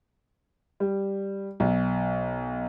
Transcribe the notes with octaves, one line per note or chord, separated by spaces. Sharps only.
G3
B1